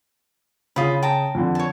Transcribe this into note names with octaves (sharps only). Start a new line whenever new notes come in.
C#3 F4 B5 D#6
G5 A5 A#5
F2 D3
C#5 A5